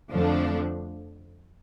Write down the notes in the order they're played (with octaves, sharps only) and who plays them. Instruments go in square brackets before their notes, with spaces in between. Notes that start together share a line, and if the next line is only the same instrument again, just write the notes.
[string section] F2 D3 F3 A3 D4